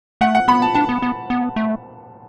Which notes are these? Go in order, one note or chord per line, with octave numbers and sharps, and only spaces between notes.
A3 F#5
F#5
B3 B5
A5
D4 A5
B3
B3
B3
A3